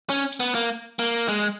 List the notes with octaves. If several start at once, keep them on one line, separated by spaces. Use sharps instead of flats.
C#4
B3
A#3
A#3
G#3